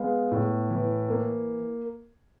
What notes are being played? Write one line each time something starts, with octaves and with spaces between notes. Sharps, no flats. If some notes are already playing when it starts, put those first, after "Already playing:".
Already playing: G#3 B3 F5
A2
E3
A#3